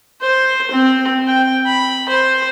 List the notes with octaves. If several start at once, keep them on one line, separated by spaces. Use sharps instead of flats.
C5
C4
G5
B5
C5